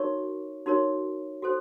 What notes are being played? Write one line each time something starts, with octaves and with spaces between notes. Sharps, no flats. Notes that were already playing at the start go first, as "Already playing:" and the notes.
Already playing: D#4 F#4 A#4 C#5 C#6
D#4 F#4 A#4 C#5
F#4 A4 C5